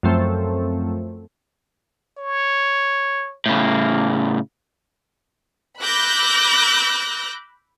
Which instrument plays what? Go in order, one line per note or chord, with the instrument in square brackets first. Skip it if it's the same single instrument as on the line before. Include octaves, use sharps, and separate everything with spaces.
[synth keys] F#2 F3 A3 C4
[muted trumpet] C#5
[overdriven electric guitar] A2 C#3 [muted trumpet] A#3
[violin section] B5 D6 E6 F#6 G6 A#6